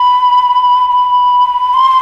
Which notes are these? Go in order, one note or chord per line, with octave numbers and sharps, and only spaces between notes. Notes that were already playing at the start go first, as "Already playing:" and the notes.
Already playing: B5
B5
C6